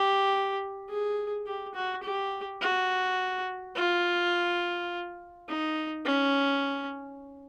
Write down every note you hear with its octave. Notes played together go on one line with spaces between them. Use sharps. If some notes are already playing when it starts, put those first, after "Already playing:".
Already playing: G4
G#4
G4
F#4
G4
F#4
F4
D#4
C#4